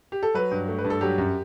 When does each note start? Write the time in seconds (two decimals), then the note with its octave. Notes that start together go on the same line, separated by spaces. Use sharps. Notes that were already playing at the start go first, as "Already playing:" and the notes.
0.12 G4
0.23 A4
0.34 F#3 B4
0.51 G2
0.68 A3
0.79 B4
0.85 G2
0.90 A4
1.01 F#3 G4
1.18 F#2